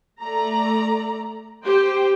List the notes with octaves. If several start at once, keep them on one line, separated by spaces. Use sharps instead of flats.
A3 D5 A#5
G4 C5 G5